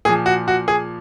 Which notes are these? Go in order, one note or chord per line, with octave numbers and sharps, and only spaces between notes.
A#2 F3 G#4
F#4
F#4
G#4